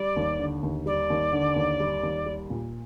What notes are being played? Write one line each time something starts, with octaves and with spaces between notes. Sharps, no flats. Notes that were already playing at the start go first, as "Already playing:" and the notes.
Already playing: G3 D5
D#2
D3
D#2
G3 D5
D#2
D3
D#2
G3
D#2
G3
A#2